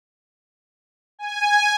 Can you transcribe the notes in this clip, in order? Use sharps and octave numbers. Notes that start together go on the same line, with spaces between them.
G#5